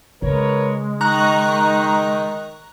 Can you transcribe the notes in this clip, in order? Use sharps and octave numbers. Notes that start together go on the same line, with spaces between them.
C#3 G#3 A#4 B4 C#5
D#3 D#4 A#5 C#6 F#6